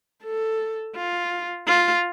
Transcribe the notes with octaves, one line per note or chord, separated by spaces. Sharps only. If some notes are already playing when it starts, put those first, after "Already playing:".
A4
F4
F4